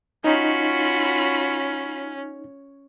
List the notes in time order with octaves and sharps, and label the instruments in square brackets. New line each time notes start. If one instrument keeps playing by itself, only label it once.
[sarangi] C#4 [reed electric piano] D#4 [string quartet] F4 F#4 B5